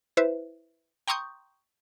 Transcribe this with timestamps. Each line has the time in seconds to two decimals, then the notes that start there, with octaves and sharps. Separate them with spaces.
0.17 E4 B4 C5 E5
1.08 G5 A#5 C6 C#6 D#6 G6